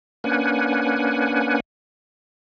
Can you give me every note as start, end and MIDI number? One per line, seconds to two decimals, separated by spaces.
0.24 1.60 58
0.24 1.60 61
0.24 1.60 62
0.24 1.60 71
0.24 1.60 78
0.24 1.60 80